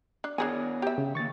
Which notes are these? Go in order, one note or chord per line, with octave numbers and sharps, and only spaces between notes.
D4
B3 D4 G#4 A#4 C#5 G#5
G4 E5
C#3
D#3 A#3 C#6 A6